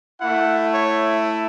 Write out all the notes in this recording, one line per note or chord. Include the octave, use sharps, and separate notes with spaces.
A3 E4 F#5
C#5